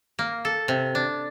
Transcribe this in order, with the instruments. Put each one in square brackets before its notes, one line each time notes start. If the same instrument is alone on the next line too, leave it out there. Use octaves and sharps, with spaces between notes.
[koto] A#3
A4
C3
D4